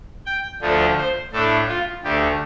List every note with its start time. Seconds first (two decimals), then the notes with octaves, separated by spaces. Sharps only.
0.26 G5
0.61 D2 D3 F3 A3 D4
0.98 C5
1.32 A2 A3 D4 A4
1.68 F4
2.03 D2 D3 A3 G4